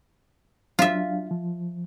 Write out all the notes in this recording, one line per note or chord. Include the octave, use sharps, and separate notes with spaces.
F#3 D4 F4 E5 F5
F3